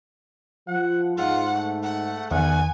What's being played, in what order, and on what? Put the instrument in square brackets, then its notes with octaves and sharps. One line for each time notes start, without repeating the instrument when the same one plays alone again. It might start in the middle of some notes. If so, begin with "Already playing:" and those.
[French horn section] F3 [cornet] F#5
[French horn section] G#2 [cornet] F4 [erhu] F#5
[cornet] A3
[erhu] F#5
[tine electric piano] E2 D#3 [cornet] F#5 [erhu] G#5